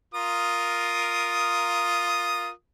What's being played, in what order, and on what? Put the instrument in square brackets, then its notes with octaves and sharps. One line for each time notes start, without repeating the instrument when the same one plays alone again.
[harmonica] F4 A#4 D#6